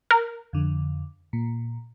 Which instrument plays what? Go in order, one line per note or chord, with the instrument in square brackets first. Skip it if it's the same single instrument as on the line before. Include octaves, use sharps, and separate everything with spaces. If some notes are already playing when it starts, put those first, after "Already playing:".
[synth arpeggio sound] A#4
[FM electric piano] F2 D3
A#2